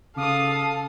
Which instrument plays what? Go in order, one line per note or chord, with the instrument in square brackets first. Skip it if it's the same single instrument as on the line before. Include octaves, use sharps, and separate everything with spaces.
[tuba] C#3 [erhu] A4 [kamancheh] F5 D#6